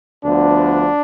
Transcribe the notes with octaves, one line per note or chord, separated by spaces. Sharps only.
D2 D3 F3 B3 D4